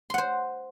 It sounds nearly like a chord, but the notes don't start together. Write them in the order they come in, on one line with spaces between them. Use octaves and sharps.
C6 F#5 C5